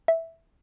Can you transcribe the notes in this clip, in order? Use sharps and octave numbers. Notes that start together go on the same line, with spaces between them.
E5